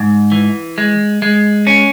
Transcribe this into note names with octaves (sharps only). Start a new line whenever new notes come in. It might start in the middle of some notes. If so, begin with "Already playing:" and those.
Already playing: G#2
E3
G#3
G#3
C#4